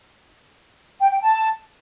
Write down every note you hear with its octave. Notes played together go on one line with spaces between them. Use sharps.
G5
G5
A5